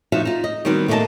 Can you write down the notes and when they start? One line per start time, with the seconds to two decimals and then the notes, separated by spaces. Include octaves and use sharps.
0.12 F3 D#4 F#4 E5 F5
0.25 D#4 F4
0.44 D#5
0.65 D#3 G3 B3 C4 F#4 B4
0.88 A3 A#3 D4 G4 D#5 A5